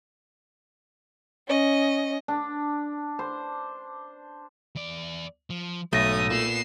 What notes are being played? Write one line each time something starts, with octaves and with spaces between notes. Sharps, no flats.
C#4 D#5
D4
C5
E2 D5
F3
B1 G#2 A3 C#5 E5 D#6 A#6
A#2 B3 C7 E7